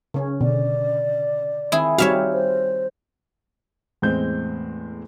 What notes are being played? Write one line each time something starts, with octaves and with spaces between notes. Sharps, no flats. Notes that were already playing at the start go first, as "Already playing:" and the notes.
C#3 C#4
B2 D3 D5
D#3 C4 E4 G#4
G3 C4 D#4 F#4 C#5 E5 F5 F6
C5
E2 A2 G#3 C4 G6